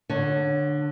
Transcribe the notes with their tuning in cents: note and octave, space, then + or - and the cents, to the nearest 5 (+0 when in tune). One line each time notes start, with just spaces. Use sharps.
D3 +15 F4 +45 C#5 +0